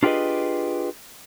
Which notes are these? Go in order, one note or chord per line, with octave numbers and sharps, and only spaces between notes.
D4 F4 G4 G#4 B4 D#5